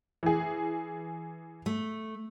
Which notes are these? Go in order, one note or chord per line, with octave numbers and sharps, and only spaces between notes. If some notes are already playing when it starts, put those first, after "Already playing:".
E3 G#4
A3